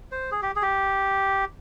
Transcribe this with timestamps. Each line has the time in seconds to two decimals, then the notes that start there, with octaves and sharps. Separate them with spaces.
0.12 C5
0.32 G#4
0.42 G4
0.56 G#4
0.62 G4